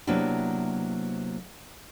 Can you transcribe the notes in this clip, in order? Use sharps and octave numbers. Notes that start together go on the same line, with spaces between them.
C3 F#3 A#3 B3 D4 E4